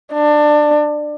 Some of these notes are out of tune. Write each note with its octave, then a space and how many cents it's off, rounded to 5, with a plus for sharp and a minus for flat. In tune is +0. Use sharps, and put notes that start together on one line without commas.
D4 +20